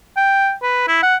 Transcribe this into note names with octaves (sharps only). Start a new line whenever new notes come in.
G5
B4
E4
F#5